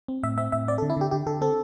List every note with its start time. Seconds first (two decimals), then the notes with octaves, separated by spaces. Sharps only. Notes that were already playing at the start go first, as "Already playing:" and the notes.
0.08 C4
0.23 A2 E5
0.38 C4 E5
0.52 A2 E5
0.68 C4 D5
0.78 A4
0.82 D3
0.90 E4
0.97 D3 G4
1.11 D3 G4
1.27 D3 A4
1.42 C4 A4